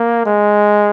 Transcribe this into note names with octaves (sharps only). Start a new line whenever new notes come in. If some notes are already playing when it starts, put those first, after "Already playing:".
Already playing: A#3
G#3